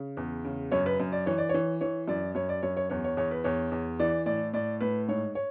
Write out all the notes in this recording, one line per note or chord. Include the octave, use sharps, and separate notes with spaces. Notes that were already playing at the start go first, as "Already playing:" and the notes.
Already playing: C#3
E2
C#3
F#2 C#5
B4
F#2
D5
E3 C#5
D5
E3 C#5
E3 C#5
F#2 D5
F#2 C#5
D5
F#2 C#5
C#5
E2 C#5
C#5
E2 C#5
B4
E2 C#5
E2
E3 D5
A2 D5
A2 D5
A2 B4
G#2 C#5
C#5